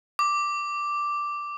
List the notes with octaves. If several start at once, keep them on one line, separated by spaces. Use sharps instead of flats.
D6